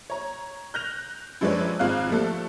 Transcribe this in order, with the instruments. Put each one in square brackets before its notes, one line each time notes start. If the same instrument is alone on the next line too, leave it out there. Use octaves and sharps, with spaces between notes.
[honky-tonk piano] C#5 A#5
F#6 G6 A#6 F7
F#2 F3 G#3 D4 B4 C#5
G#1 G#3 C4 F4 F5 F#6
F3 G3 A3 A4